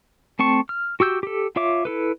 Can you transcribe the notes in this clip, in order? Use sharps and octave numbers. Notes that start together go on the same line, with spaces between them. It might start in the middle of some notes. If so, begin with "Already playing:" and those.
A3 C4 A5 C#6
F6
F#4 G4 E6 G6
G4 A4
F4 C#5 E5 D6
E4 A4 B4